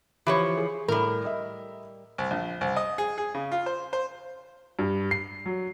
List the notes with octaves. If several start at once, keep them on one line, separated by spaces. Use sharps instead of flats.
E3 F3 G4 C#5
G#4
A2 G3 A#4
D#5 E5
C2
A#1
C2
D#5
G#4
G#4
C#3
F4
C5
C5
G2
C7
F#3